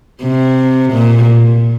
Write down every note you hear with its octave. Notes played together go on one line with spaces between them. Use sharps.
C3
A#2